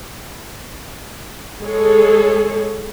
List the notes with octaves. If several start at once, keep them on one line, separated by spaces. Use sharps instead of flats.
G#3 G#4 A4 C#5